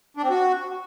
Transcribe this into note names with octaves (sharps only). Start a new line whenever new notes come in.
D4
C4
F#4